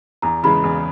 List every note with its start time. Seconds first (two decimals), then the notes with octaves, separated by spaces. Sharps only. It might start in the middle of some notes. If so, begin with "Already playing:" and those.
0.22 E2 A#5
0.43 C#3 E3 G#3 B5
0.64 E2